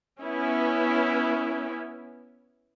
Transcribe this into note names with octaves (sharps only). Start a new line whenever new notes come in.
B3 C#4 E4